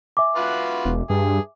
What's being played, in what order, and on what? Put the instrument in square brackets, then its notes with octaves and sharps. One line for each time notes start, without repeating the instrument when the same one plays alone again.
[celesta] E5 G#5 D6
[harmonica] F4 F#4 B4
[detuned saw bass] E1
[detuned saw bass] G2 [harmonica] G#4